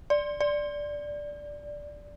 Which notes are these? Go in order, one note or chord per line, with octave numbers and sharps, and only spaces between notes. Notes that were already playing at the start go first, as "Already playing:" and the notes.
D5
D5